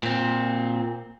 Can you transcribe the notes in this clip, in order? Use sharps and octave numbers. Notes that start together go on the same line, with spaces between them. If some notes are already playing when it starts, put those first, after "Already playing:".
A#2 C4